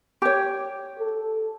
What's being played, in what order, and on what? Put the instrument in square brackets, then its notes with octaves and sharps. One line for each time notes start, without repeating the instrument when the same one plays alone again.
[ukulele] G4 C#5
[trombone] A4